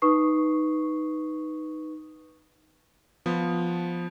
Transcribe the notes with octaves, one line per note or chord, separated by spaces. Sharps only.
D#4 B4 C#6 D#6 C7
F3 B3